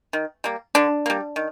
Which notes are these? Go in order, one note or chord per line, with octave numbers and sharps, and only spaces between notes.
D#3
G3 A#3
D3 D4
G3 A#3
D#3